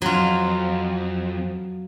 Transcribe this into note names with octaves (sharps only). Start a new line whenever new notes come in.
F2 F#3 F4